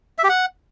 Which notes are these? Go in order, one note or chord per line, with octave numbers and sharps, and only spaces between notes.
E5
G4
F#5